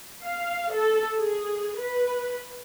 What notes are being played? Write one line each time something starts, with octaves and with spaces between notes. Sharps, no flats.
F5
A4
G#4
B4